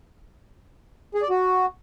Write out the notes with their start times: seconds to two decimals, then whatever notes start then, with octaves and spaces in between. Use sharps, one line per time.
1.15 G#4
1.22 D5
1.30 F#4